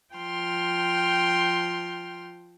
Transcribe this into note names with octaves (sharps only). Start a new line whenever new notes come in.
F3 G5 C6 F6